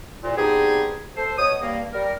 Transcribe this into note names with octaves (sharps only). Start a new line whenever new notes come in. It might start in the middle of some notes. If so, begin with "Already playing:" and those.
C2 A#2
B3 C4 D4 D#4 G4 G#4
A4 C5
B2 C#5 D#6
G2 A#3
G3 A#4